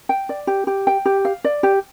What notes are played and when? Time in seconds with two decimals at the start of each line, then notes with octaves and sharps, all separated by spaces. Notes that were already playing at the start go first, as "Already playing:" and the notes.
0.09 G5
0.29 D5
0.47 G4
0.67 G4
0.87 G5
1.05 G4
1.25 F5
1.44 D5
1.63 G4